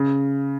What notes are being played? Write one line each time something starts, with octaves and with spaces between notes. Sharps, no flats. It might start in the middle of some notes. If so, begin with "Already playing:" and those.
Already playing: C#3